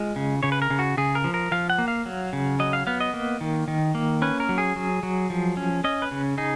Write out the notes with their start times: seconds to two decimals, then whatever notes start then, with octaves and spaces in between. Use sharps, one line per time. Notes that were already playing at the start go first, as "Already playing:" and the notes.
Already playing: G#3 F4
0.16 C#3
0.43 C#3 C#5
0.52 B4
0.62 A#4
0.70 C#3
0.79 F#4
0.97 C#3 G#4
1.15 A#4
1.24 F3
1.34 A#4
1.51 F3 F5
1.70 F#5
1.78 A#3
1.88 F5
2.06 F#3
2.33 C#3
2.59 F#3 D#5
2.73 F5
2.87 B3 F5
3.01 D#5
3.14 A#3
3.41 D#3
3.68 D#3
3.95 A#3
4.22 C#4 B4
4.40 A#4
4.49 F#3
4.58 G#4
4.76 F#3
5.03 F#3
5.30 F3
5.57 C#4
5.84 C#4 D#5
6.02 B4
6.11 C#3
6.38 D#4 G#4